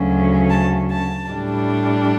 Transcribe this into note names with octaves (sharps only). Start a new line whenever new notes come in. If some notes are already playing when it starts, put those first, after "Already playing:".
Already playing: D2 C#3 F#3 C#4
A5
A5
A2 G3 D4